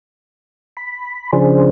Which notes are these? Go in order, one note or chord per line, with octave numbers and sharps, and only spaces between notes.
B5
C#3 F3 D4 G#4 C5